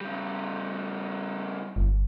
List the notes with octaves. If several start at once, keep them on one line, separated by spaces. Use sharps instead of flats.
C#3 G3
G1